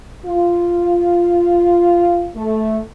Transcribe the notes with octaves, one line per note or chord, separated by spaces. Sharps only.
F4
A3